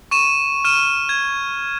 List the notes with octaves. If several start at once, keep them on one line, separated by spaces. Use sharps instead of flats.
C#6 D#7 E7
F6 D#7 E7
G#6